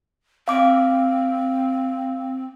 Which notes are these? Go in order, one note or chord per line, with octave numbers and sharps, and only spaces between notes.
C4 F5 D6